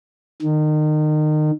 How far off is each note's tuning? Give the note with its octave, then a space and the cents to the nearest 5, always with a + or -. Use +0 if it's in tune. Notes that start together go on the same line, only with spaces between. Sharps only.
D#3 -30